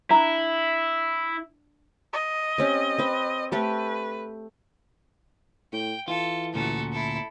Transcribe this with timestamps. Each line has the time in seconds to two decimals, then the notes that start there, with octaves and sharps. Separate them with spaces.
0.11 D4 E4 A#5
2.13 D#5
2.58 C4 C#4 G4
2.99 C4 B4
3.52 A3 G4 A4 B4
5.73 A2 G5
6.08 E3 F4 A4
6.54 D2 A#2 C#4 F#4 A4
6.92 E4 A4